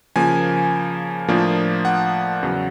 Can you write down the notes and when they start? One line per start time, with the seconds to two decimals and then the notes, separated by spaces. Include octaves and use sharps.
0.16 C#3 F3 A#3 G#5
1.28 A2 F3 A#3 D4 F4
1.85 F#5
2.43 E2 C#3 F#3